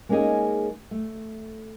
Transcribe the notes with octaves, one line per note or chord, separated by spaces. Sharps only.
G#3 A#3 C#4 D#4 G#4
A3